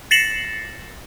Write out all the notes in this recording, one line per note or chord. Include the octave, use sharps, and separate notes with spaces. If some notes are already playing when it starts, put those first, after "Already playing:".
A6 A#6 C7 C#7 E7 F#7